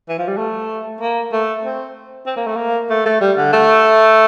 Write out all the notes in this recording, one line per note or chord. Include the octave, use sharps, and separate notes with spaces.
E3
F3
G3
A3
A#3
A3
C4
C4
A#3
A3
A#3
A3
A3
G3
D3
A3